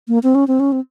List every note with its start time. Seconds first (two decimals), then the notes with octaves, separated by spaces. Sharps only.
0.08 A#3
0.23 C4
0.35 C#4
0.48 C4
0.60 C#4
0.72 C4